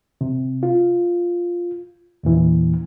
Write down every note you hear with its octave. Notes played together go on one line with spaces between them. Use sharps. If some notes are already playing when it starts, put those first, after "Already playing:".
C3
F4
E2 A#2 E3